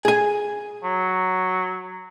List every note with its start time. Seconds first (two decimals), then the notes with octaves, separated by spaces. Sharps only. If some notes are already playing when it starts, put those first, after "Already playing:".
0.05 G#4 G#5
0.84 F#3